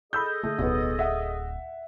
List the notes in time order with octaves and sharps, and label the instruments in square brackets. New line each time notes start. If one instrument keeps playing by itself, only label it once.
[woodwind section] G#4 A4 D#5 [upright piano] B5 E6 G6
[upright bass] D3 [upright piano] A3
[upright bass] D1 [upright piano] B1 B3
[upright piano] E5 F#5